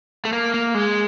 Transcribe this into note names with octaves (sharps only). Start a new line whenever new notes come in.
A3
A#3
A#3
G#3